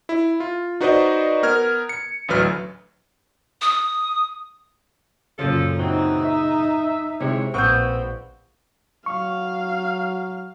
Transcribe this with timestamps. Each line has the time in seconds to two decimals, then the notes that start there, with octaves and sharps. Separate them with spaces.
0.09 E4
0.40 F4
0.81 D#4 F#4 B4 C5 D5 D#5
1.43 B3 A#4 F6 G#6
1.89 C#7
2.28 A1 D2 F#3 B4 F6
3.62 D#6
5.39 F#2 A#2 C#3 F3 A4
5.79 E3 F#3 C4 D#4
6.24 E5
7.20 G#2 C3 G#3 E4 C#5
7.54 A#1 B3 C4 C#6 G6
9.06 F#3 F5 C#6